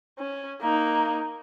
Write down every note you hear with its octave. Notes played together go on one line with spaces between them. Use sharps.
C#4
A#3 D#4